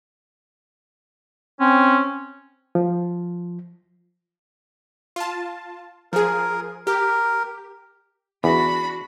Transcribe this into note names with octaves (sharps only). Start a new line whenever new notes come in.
C4 C#4
F3
F4 A5
F3 G#4 A#4
G4 A#4
E2 D4 F#4 B5